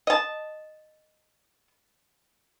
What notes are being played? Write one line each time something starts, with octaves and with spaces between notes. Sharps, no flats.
D#5 A5